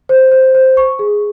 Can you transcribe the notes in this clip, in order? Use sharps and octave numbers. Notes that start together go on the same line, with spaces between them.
C5
C5
C5
C#6
G#4